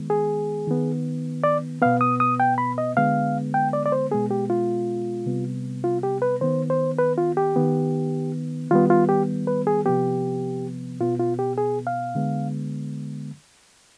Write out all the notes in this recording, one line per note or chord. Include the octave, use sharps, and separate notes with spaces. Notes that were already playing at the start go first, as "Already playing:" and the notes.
Already playing: D#3 G#3 B3
G#4
D#3 B3
D5
B2 B3 F5
D#6
D#6
G5
B5
D#5
D3 G#3 B3 F5
G5
D5
D5
C5
B2 G#3 B3 G#4
G4
F4
C3 G3 B3
F4
G4
B4
D#3 B3 C5
C5
B4
F4
G4
D#3 B3
D#3 G3 B3 F4
F4
G4
B4
G#4
C3 F3 B3 G4
B2 B3 F4
F4
G4
G#4
F5
D3 G#3 B3